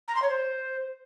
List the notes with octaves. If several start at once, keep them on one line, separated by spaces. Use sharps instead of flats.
A#5
C6
C#5
C5